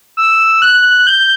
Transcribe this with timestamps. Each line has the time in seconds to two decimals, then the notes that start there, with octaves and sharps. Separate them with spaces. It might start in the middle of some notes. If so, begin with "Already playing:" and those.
0.17 E6
0.62 F#6
1.07 G6